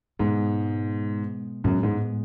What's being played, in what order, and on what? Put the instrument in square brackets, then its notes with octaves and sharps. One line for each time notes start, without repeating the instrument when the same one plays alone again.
[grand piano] G#2 [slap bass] B2 G#3 B3
[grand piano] F#2 [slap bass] A2 G#3 B3
[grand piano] G#2